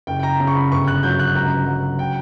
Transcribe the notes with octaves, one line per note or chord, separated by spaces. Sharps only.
F#1 G5
G5
A#5
C#3 A#5
C#6
B5
G1 C#6
F#6
F#3 G6
F#6
C#2 A#5
F#3
G5